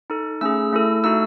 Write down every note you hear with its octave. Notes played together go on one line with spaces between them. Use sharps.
D#4 A4
A3 C#4 G#4 E6
A3 E4 A4
A3 D#4 F#4 A4 E6